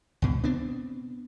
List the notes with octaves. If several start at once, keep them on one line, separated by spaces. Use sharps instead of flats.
C#2 B2
B3 C4 D4